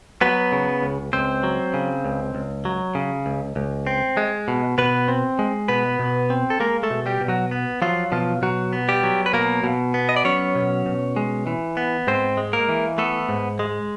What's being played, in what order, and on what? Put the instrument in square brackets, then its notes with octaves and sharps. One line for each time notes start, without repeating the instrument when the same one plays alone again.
[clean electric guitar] F#3 B3 B4
C#3
C#2
C#2 C4 C5
F#3
C#3
C#2
C#2
F#3
C#3
C#2
C#2
C4
G#3
B2
B2 B3 B4
C4
G#3
B2 B3 B4
B2
C4
A4
G#3 A#3 A#4
A3 A4
B2
G3 G4
B2
F#3 F#4
B3
F3 F#3 F4
B2 F3 F4
B2 F#3 F#4
B3
G3 G4
F#3
B4
B2 A#3 A#4
B2
B3
D#5
D5
F#3 C#4 C#5
B2
B2
G#3
E3
B3
G#2 C4 C5
G#3
A#3 A#4
E3
A3 B3 A4
G#2
G#3